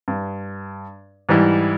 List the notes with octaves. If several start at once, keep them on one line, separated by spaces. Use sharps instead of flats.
G2
G#2 E3 G3 E4